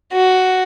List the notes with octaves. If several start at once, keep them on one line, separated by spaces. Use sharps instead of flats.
F#4